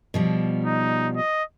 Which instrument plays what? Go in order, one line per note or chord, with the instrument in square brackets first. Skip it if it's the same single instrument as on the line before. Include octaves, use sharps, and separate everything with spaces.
[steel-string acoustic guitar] B2 F3 G3
[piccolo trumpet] D#4
D#5